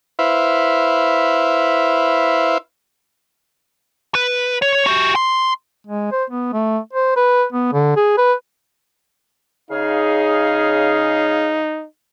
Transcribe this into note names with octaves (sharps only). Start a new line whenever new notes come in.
E4 B4 C5 E5 F5
B4
C#5
F#4 G4
C6
G#3
C5
B3
A3
C5
B4
B3
D3
G#4
B4
C#3 D#4 G#4 F5